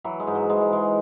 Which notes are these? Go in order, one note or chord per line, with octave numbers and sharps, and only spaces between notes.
E3 F#3
G#3
G#2
F#3
E3 G#3
G#3
E3 G#3